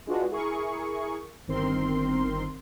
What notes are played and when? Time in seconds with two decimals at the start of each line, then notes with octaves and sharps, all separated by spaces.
0.07 G#3 D4 F4 F#4 B4
0.31 E4 G#4 A#4 C#6
1.48 G1 D#3 C4 A#4 C6